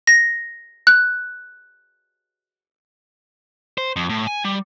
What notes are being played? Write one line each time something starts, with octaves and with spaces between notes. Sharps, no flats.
A#6
F#6
C5
F2
A2
G#5
G3